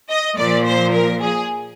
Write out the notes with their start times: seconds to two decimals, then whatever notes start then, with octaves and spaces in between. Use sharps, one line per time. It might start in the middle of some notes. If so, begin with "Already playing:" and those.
0.10 D#5
0.37 A#2 F3 D5
0.66 C5
0.94 A#4
1.21 G#4